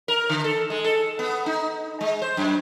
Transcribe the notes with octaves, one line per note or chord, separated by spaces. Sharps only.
A#4
D3
A4
G#3
A4
B3
D#4
G#3
C5
F#2